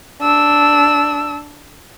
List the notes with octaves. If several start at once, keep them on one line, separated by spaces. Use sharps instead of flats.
D4 E6